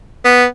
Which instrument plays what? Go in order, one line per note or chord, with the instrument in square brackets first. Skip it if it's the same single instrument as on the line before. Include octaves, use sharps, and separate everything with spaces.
[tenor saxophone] B3